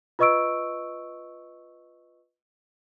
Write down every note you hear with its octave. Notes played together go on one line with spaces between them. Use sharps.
F4 B4 D#5 C#6 E6 D7